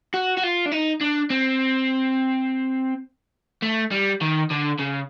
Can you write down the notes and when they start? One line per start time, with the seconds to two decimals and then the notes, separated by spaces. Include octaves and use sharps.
0.14 F#4
0.37 F#4
0.43 F4
0.65 D4
0.71 D#4
1.01 D4
1.30 C4
3.63 A3
3.91 G3
4.21 D#3
4.50 D3
4.79 C#3